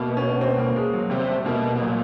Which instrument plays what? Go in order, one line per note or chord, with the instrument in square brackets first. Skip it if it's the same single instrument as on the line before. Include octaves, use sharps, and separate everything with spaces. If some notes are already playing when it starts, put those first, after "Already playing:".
Already playing: [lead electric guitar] B2 [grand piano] A3 A#3
[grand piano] C#4
C4
A#3
G#3
F#3
[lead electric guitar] C3 [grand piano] G3
[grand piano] A3
[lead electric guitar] B2 [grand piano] A#3
[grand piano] A3
[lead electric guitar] B2
[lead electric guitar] A#2 [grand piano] F#3